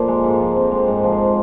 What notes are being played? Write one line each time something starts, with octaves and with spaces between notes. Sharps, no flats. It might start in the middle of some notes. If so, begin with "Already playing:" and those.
Already playing: A#2 F3 A#3
G#3
G#2
F3
C4
G#3
G#2
F3
C4